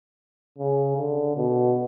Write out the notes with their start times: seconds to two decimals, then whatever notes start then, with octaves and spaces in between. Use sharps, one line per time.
0.59 C#3
0.98 D3
1.37 B2